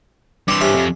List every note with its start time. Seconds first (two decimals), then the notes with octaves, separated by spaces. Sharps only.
0.48 G2 E3 D5 C6
0.61 C3 C#4
0.75 F2